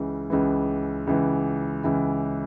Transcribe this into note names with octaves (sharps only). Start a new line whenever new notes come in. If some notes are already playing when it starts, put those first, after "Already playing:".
Already playing: C#2 C#3 E3
C#2 C#3 E3
C#2 C#3 E3
C#2 C#3 E3